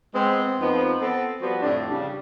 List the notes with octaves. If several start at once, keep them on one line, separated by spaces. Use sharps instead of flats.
G#3 B3 C4
F2 F3 B3 D#4
B3 C4 A4
F3 G3 B3 F#4
F2 A2 D3 D4
C#3 G3 D4